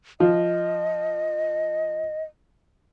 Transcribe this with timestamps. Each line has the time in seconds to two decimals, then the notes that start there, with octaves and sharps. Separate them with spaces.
0.20 F3 D#5